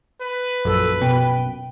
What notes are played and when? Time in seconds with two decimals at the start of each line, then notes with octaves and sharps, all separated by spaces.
0.21 B4
0.65 A#1 F#2 A4
1.01 B2 G5